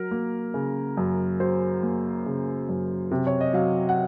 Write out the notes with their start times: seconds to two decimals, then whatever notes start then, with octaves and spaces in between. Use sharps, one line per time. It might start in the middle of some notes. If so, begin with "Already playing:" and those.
Already playing: F#3 A#4
0.11 A#3
0.54 C#3
0.97 F#2
1.40 F#3 C5
1.83 A#3
2.26 C#3
2.69 F#2
3.11 C3
3.27 C#5
3.41 D#5
3.53 F#3 F5
3.89 F#5